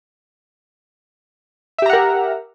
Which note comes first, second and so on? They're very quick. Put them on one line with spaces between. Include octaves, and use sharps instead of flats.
E5 G4 A#5 F#5 A#4